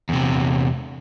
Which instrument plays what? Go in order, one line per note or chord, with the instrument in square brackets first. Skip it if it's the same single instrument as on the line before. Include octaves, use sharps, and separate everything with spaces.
[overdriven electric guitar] E2 C3